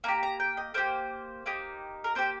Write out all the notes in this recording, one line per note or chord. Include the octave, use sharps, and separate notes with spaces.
A#3 D#4 G4 A#5
A#5
G5
D#5
A#3 D#4 G4 C5
A#3 D#4 G4
A#4
A#3 D#4 G4 C5